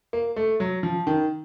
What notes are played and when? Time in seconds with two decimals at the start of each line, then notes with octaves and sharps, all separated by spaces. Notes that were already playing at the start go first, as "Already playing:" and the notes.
0.13 A#3
0.36 A3
0.60 F#3
0.83 F3
1.07 D#3